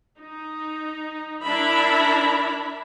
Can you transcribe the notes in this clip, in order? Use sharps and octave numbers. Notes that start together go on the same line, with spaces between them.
D#4
D4 E4 A#4 E5 B5